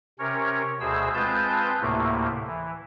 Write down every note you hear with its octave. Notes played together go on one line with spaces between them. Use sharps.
C3 C#4 A#4 C#5
D2 B2 G#4 C5 E6
G#3 C4 F4 B4 A5 G6
D2 A2 C3 A3 A#3
E3